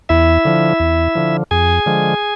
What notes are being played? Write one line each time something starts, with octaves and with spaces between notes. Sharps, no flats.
E2 E4 E5
D3 F3
E2
D3 F3
F2 G#4 G#5
D3 F3 G#3